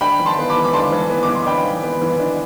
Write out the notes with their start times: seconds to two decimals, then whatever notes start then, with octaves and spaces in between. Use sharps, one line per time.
0.01 D4 G5 B5
0.20 E3
0.26 A5 C6
0.38 B3
0.49 B5 D6
0.57 E3
0.64 D6
0.73 D4 A5 C6
0.92 E3
1.10 B3
1.23 D6
1.28 E3
1.35 C6
1.46 D4 G5 B5
1.65 E3
1.84 B3
2.02 E3
2.20 D4